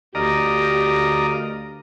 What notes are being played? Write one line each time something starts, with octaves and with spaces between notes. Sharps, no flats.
D2 G4 A#4 D5 D#5 F5 A#5